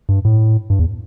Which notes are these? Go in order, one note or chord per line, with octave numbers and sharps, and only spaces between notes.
G2
A2
G2
E2